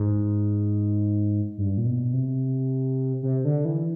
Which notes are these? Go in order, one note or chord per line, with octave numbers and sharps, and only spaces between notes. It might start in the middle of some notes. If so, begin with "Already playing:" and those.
Already playing: G#2
G2
A#2
B2
C3
C3
D3
E3